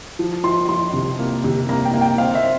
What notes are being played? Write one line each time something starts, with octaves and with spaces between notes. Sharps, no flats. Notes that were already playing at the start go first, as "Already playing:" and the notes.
F3
F3 C6
F3 C6
C3
A#3
C3
A#3 A#5
G5
A#3
G5
C4 F5
E5
C4